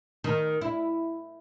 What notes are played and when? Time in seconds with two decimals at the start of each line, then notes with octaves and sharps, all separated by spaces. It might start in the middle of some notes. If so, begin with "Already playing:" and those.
0.24 D#3
0.61 E4